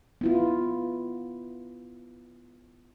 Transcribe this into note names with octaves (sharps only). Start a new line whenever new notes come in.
B3 E4 F4